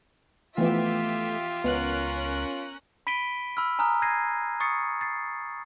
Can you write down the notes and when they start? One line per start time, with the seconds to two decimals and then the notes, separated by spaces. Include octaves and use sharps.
0.58 E3 F3 A3 B3 F4 G4 E5
1.64 C#2 B3 C#4 A#4 F#6
3.07 B5 B6 D7 D#7 G7
3.57 B5 E6 F6
3.79 G#5 A#5 D#6 F6 F#6
4.02 F#6 G#6 A#6 C7 D#7
4.60 C#6 D#6 A6 C7 C#7
5.01 A6 C7